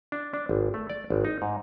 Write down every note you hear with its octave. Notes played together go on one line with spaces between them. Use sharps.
D4
D4
G#1
A3
D5
G#1
D#4
G#2